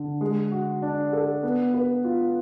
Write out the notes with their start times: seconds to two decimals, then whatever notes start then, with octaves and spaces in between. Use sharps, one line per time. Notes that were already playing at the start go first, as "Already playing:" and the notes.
Already playing: D3
0.21 G#3
0.52 F#4
0.82 D4
1.13 A4
1.43 B3
1.74 B4
2.04 F4